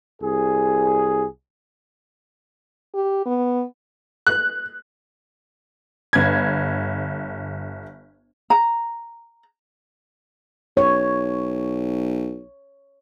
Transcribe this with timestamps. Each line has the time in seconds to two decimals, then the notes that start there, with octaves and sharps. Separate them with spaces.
0.23 C2 G#4
2.94 G4
3.26 B3
4.27 F#6
6.13 G1 G#6
8.50 A#5
10.77 B1 C#5